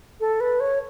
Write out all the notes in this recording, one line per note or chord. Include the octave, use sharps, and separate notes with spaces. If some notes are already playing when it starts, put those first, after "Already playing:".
A4
B4
C#5